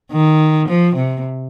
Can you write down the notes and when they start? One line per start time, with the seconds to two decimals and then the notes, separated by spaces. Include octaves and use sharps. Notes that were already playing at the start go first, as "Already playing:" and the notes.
0.11 D#3
0.68 F3
0.96 C3